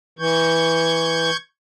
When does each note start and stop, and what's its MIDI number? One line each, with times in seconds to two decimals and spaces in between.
0.19 1.30 52
0.19 1.37 85
0.19 1.37 91
0.19 1.37 92